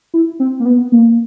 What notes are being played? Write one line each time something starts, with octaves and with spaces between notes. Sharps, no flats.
E4
C4
A#3
B3
A#3